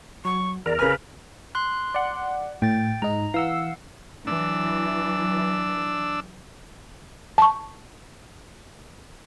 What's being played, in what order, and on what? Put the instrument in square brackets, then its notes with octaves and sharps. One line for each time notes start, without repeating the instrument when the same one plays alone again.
[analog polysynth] F#3 [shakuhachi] C#6
[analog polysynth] E2 [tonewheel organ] A#4 [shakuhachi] D5
[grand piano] C#3 F6 [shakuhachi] B4 [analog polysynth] G#5
[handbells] C6 F#6
[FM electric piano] D5 F#5
[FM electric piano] A2 [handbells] G5 A6
[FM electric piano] G#2 D#4 [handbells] A#5
[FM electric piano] E3 E6 [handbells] F5 F#5
[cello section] E3 F#3 [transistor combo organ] D4 E6
[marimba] A5 C#6